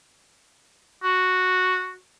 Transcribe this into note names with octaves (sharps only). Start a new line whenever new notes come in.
F#4